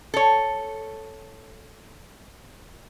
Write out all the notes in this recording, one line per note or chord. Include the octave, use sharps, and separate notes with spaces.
A4 C#5